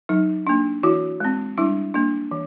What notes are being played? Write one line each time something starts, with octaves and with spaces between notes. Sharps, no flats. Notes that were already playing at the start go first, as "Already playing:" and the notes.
F#3 D#4
A#3 D4
E3 E4 F#4
G#3 C4
G3 D4 E4
A#3 D4
E3